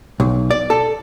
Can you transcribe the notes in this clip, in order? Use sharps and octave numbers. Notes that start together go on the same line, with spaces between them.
B1
D5
A4